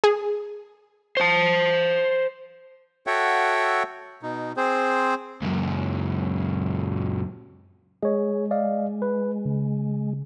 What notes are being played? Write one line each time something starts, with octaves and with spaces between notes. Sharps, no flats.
G#4
C5 A5
F#4 A4 C#5 E5 F#5 G5
B2 D#4
C4 G#4 C5
C#2 F#2
G#3 G#4 C#5
D5 D#5 F5
B4
C#3